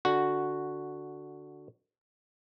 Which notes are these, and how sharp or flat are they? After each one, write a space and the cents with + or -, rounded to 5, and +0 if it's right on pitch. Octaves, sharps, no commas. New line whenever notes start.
D3 +0 F#4 +0